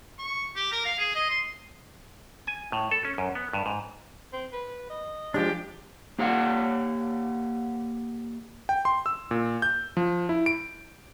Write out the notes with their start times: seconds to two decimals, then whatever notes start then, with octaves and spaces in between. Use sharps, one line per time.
0.19 C#6
0.56 G4
0.72 A#4
0.85 F5
0.99 G#4
1.15 D#5
1.30 C6
2.47 G#5
2.72 A2
2.91 A4
3.05 C#4
3.18 F#2
3.35 B3
3.53 G2
3.66 G#2
4.33 C4
4.53 B4
4.89 D#5
5.34 F3 G#3 D4 G4
6.19 A#3 G4 F5 F#5
8.69 G5
8.85 C6
9.06 E6
9.31 A#2
9.62 G6
9.97 F3
10.29 E4
10.46 D7